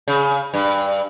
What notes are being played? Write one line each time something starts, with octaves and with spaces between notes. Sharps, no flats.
C#3
G2